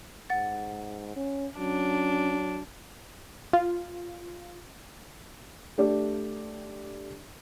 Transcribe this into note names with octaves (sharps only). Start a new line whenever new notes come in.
G#2 F#5 A6
C#4
F#3 C#4 D4
F4
A3 D4 G4 D5